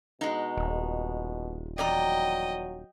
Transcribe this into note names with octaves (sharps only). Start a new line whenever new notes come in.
B2 G#3 D#4
D#1
E2 F#3 D5 D#5 G5 A#5